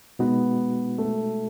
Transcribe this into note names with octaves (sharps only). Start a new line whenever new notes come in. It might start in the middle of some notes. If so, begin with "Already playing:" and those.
B2 G#3 B3 D#4 F#4
A3